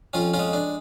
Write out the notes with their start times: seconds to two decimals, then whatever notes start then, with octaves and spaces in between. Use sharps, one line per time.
0.13 F2 C#4 F4
0.34 C#4 F4
0.39 G#3
0.53 D4